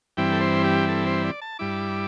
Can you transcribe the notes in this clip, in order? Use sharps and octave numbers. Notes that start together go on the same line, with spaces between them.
G2 E3 G3 C4 E4 G5
A4
C5
G4
A4
C5
D5
A5
G2 G3 E4 D6